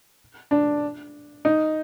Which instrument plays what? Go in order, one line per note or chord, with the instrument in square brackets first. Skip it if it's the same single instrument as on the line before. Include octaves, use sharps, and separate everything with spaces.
[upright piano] D4
D#4